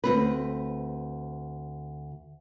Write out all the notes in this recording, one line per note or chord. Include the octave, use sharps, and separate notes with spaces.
D2 C4 B4